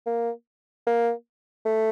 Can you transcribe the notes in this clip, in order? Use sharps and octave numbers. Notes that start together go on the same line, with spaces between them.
A#3
A#3
A3